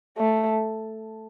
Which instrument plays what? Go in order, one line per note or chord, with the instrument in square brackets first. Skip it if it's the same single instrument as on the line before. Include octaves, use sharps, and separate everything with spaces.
[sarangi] A3